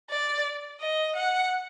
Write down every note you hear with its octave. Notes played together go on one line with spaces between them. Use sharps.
D5
D#5
F#5